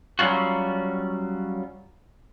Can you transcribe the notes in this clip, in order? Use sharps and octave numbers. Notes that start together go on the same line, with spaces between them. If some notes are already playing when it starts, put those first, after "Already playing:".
F#3 G3 C#4 F4 F#4